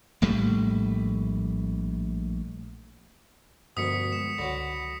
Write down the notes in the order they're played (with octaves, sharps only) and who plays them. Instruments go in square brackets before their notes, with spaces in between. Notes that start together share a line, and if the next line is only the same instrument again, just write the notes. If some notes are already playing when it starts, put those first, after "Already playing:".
[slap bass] A#1 A2 G3 A3
[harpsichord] D2 B2 [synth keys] G2 F3 A#4 [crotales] D#6 B6 C#7
[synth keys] G#3 [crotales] E7
[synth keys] C#2 B5 A#6 [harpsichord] D3 F#3